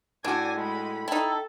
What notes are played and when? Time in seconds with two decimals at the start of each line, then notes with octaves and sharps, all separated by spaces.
0.24 A2 D4 F#4 D5 G#5
0.55 G#3 B5
1.08 D#4 E4 A4 G5